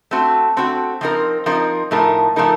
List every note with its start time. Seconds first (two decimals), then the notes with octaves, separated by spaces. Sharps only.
0.11 A3 C4 F#4
0.57 A3 C4 F#4
1.01 F3 C4 D#4 A#4
1.46 F3 C4 D#4 A#4
1.91 A2 F3 A3 D#4 A#4
2.36 A2 F3 A3 D#4 A#4